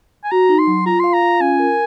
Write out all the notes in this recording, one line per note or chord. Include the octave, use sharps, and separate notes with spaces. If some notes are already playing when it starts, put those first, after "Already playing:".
G#5
F#4 A#5
D#4
C6
F#3
F4 A#5
F5 C6
A#5
F4
C#4 G#5
A#4